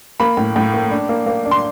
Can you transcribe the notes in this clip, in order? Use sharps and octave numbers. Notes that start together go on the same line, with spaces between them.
A#3 B5
A2
A2
A#3
D4
A#3
A#3
D4
C6